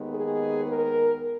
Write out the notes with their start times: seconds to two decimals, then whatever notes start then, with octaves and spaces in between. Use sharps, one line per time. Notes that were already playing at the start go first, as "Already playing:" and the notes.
Already playing: D#2 D#3 G#3 B3
0.15 G#4
0.67 A#4